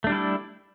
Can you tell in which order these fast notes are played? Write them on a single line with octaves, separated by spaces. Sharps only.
A3 D4 G3 E4 A4